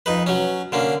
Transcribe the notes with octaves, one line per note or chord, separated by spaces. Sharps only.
F2 D#4 B4
F#3 C#4
D3 A#3 C#4